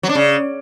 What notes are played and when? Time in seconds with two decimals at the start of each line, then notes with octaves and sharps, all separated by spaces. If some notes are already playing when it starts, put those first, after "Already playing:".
0.03 F#3
0.09 D4
0.15 C#3